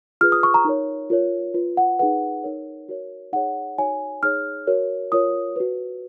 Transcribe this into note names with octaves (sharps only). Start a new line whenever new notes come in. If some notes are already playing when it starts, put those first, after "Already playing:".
F4 G#4 B4 F6
D#6
C#6
A#5
D#4 A#4 C#5
F4 A#4 C#5
F4 B4
F#5
D#4 G#4 B4 F#5
D#4 A#4 C#5
F#4 A#4 C#5
D#4 G#4 C#5 F#5
D#4 F#4 C#5 G#5
D#4 G#4 C#5 F6
F#4 A#4 C#5
F4 A#4 C#5 D#6
F#4 B4